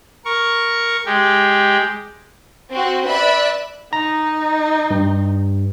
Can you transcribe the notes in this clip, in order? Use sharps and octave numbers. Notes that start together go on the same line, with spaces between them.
A#4 C#6
G#3 G4
C4 F#4
B4 D5 E5 B5 E6 F#6
D#4 A#5
G2